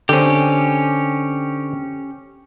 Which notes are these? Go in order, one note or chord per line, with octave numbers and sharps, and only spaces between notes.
D3 C4 C#4 G4